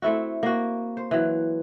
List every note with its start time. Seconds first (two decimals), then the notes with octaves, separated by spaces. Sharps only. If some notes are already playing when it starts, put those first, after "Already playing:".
0.02 A3 C4 E4 F#4
0.43 A#3 F#4
0.97 C5
1.11 E3 F#3